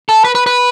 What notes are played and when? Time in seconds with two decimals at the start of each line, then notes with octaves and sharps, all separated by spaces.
0.09 A4
0.25 B4
0.35 B4
0.46 B4